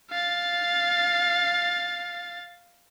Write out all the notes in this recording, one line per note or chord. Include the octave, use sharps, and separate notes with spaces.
F5 A6